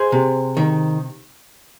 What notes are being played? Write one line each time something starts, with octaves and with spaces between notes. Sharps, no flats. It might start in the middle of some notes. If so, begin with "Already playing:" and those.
Already playing: G#4 C5
C3
D#3